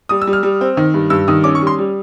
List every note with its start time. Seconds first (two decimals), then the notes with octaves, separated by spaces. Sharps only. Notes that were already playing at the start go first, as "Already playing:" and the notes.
0.09 G3 D#6
0.22 E6
0.27 G3
0.33 F6
0.43 G3
0.61 C4
0.77 D#3
0.94 G2
1.10 G2 E6
1.28 D#3 D#6
1.44 C#4 D6
1.55 C#6
1.61 G3
1.67 C6
1.79 G3